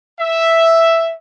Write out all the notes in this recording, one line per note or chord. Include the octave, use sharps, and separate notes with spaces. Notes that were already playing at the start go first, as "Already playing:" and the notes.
E5